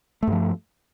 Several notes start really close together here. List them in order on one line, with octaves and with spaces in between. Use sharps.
A3 G2 F3